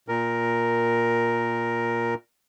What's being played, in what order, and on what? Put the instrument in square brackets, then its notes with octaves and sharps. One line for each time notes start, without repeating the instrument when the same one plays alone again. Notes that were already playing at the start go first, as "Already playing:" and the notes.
[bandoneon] A#2 A#4